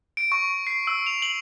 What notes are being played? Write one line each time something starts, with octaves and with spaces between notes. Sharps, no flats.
D7
C#6
C7
E6
F7
F#7